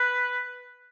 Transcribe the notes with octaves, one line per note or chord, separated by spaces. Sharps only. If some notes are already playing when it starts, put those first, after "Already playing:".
Already playing: B4